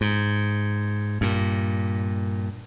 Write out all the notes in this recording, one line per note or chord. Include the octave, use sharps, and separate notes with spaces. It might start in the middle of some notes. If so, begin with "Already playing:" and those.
G#2
G2 A#2